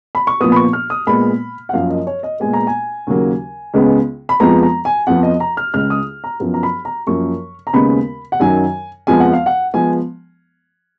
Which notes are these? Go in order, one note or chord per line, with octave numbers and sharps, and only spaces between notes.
B5
C#6
A#2 F3 B3 D#6
B5
C#6
F6
D#6
A#2 G#3 B3 B5
F#5
F#2 F3 A#3 F5
D#5
C#5
D#5
A#2 G#3 B3 G#5
A#5
G#5
D#2 C#3 F#3 A#3
C#2 C#3 G#3 B3
B5
F2 F3 G#3 B3 A#5
A#5
G#5
F2 F3 B3 F#5
D#5
A#5
F6
C#2 C#3 G#3 F6
D#6
A#5
F#2 F3 B3
A#5
B5
A#5
F#2 F3 A#3 C#6
A#5
D#2 C#3 G#3 B3 B5
F#5
F#2 D#3 F#3 G#5
F2 F3 G#3 B3 G#5
F#5
F5
F#5
F3 G#3 B3 G#5